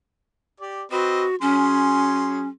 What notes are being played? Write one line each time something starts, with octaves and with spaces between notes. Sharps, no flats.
G4 D5
C4 F#4 B4 D#5
F#3 C#4 G#4 C6